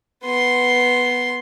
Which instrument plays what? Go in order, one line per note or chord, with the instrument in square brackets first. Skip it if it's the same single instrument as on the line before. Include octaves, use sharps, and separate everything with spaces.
[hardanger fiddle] B3 C6